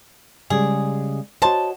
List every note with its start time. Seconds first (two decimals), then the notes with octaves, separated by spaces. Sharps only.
0.50 C#3 G3 G#3 G#4
1.42 F#4 C5 C#5 D#5 A5